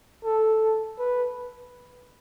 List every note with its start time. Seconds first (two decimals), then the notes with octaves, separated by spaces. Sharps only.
0.25 A4
0.99 B4